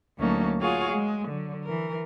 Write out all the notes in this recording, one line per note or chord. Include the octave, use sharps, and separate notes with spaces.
D2 F#3 A#3 C#4 D#4 A5
F4 F#4 G#4 C#5 F5 F#5
G#3
D3 F#3
E3 A#4